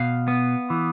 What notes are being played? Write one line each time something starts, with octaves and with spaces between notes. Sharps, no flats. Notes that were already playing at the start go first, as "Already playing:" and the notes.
Already playing: B2 F5
B3
E3